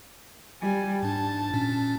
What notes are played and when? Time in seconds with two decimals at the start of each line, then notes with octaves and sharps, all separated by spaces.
0.62 G3 G#5
1.03 G#2 D4 A5
1.53 A#2 C#4